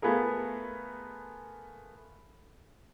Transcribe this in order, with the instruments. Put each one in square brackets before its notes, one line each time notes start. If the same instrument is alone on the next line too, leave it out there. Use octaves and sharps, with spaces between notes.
[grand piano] A3 B3 F4 G#4 A#4